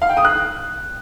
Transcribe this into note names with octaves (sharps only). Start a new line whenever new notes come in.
F5
G5
D#6
F#6